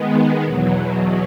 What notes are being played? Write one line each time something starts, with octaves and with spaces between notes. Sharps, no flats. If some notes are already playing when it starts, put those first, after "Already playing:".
Already playing: D#3 G#3 B3
E2 B2 F#3